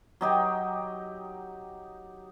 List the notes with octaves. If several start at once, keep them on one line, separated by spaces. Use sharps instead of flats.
F#3 D#4 G4